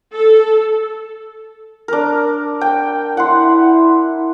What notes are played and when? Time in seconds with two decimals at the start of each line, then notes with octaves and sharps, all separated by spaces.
0.14 A4
1.88 D4 A#4
2.61 G5
3.17 E4 F#5 C6